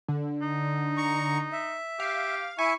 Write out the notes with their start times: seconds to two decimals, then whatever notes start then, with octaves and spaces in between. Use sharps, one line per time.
0.08 D3
0.42 D#4
0.97 A#5 C#6
1.52 E5
2.00 G4 F5
2.59 E4 E5 G#5 C#6